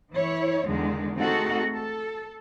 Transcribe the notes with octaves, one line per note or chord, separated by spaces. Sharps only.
E3 E4 C#5
E2 D3 D#3 G#3
A3 C4 D#4 F#4 G#4 A4
A4